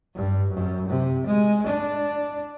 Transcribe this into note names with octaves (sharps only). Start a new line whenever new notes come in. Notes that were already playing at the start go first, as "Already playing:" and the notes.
G2
F#2
C3
G#3
D4